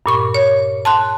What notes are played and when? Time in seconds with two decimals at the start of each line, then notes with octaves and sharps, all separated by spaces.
0.06 G2 A#2 C#6
0.34 C#5
0.85 A5 C6 F#6